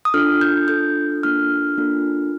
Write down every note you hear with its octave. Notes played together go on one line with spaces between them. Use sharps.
D#6
D4 F4 A4 F6
G6
D4 F4 A4 G6
A#3 D4 F4 A4 F6
A#3 D4 F4 A4